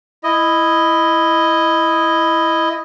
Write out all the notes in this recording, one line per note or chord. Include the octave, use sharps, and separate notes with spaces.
E4 D#5